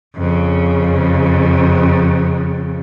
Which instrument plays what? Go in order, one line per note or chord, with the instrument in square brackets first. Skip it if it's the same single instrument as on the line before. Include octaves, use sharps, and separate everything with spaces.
[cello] F2 C#3